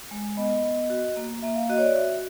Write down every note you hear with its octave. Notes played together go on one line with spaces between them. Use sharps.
G#3
B3 D#5
B3
F#4
A#3
A#3 E5
F5
F#4 D#5
C#5
D5
F#4 E5